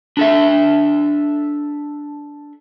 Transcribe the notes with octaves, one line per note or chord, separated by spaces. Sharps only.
D4 A4 E5